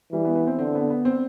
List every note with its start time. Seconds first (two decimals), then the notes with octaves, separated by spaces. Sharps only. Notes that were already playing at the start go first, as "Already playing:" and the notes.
0.12 E3 G3
0.25 B3
0.35 B3
0.47 C4
0.59 D3 C4
0.75 B3
0.90 B3
1.05 C4